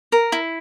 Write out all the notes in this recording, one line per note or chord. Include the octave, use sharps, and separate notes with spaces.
A#4
E4